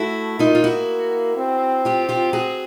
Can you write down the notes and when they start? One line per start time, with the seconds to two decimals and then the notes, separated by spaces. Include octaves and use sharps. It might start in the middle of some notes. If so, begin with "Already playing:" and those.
Already playing: A3 E4 F#4
0.39 A#3 D#4 F4
0.55 F4
0.64 E4 F#4
1.37 C4
1.85 F4 G4
2.09 F4 G4
2.33 F#4 G#4